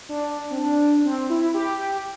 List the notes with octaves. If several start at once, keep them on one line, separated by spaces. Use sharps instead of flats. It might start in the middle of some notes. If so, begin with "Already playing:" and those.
D4
C4
D4
C4
E4
G4